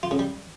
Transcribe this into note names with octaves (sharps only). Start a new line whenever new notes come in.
F4
C#3
G3